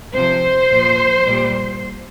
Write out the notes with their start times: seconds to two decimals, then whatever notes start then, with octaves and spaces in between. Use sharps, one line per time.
0.15 C3 F3 C5
0.70 A#2 F3
1.26 A#2 G3